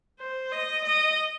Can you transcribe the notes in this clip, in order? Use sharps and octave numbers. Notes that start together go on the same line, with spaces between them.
C5
D#5
D#5